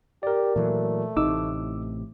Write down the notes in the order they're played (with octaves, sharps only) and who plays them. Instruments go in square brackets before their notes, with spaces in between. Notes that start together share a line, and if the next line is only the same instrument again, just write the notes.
[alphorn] G4 [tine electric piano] A#4 D5
[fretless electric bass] A#2 E3 F#3 [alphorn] A3
[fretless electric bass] A1 A2 C3 [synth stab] D#4 [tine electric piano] D6 E6